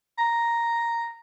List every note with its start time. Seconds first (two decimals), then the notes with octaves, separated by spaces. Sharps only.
0.18 A#5